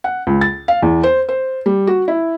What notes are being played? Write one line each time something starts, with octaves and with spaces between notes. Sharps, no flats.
F#5
C#2
A6
F5
E2
C5
C5
G3
F#4
E4